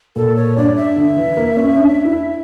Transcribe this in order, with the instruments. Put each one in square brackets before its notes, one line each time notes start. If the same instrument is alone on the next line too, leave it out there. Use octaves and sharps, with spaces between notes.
[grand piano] A#2 [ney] A4
[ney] C#5
[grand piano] G2 [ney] D5
[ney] E5
[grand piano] D3
E3
A#3
C#4
D4
E4